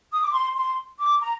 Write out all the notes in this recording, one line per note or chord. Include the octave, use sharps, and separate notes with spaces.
D#6
D6
C6
C6
D6
A#5